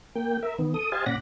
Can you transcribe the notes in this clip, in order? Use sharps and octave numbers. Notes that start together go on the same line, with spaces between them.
A#3 G5
A#4 E5
D#3 B3
A4 D#6
G4 C5 D#5 F5 G#5 A5
A#2 C#4 D5 F#5 B5 A#6